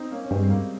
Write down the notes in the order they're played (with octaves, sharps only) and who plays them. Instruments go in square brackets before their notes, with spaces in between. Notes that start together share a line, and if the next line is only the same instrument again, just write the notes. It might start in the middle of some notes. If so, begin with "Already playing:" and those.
Already playing: [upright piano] C4 D#4
A#3 C#4
C#4
[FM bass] G2 [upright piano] G#3 C4
[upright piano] C4
G3 A#3